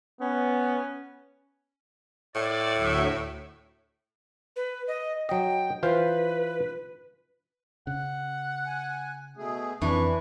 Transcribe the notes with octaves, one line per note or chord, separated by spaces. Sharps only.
B3 C#4
A2 D5
D2 F#3 E5
B4
D#5
F#3 D#5 G5
E3 F4 B4 C5
C#3 F#5
G#5
B2 A3 G#4
F2 E3 C4 D4 C#6